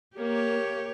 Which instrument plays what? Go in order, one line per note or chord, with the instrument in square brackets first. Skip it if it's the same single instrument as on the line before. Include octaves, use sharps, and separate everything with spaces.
[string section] A#3 [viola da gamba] G4 C#5